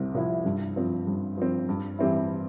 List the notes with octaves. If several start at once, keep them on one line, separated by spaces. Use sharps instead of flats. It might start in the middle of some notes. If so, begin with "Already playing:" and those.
Already playing: C2 C3 C4
C3 F3 C4 E4
G2
F3 C4
G2
F3 C4
G2
E3 G3 C4 E4